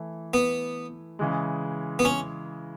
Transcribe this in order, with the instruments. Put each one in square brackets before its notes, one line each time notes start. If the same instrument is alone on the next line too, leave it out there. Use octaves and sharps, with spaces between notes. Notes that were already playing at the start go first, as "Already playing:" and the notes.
Already playing: [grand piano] E3 A3 E4
[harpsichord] B3
[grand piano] C#3 E3 G#3
[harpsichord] B3
C#4